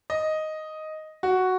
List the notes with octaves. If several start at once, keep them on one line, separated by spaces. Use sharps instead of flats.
D#5
F#4